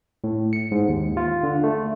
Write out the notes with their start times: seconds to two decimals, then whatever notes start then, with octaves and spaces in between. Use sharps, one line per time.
0.24 A2
0.53 C#7
0.71 G#2
0.88 D#2
1.17 F4
1.43 D3
1.64 A3